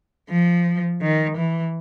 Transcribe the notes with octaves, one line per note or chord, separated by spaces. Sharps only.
F3
D#3
E3